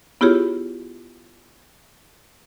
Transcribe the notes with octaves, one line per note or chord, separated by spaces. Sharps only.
B3 E4 F4 G4 G#4 C#5